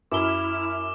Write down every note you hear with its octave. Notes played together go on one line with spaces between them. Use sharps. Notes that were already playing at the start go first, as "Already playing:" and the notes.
F#2 E4 D6 F6 G7